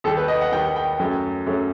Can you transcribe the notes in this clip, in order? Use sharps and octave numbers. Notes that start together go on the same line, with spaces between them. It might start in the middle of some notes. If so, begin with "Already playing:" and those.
D#2 D#3 G3 A4
B4
D#5
F#5
D#2 D#3 G3 G5
G5
F#2 F#3 A3
F#2 F#3 A3